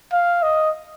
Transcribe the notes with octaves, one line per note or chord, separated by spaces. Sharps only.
F5
D#5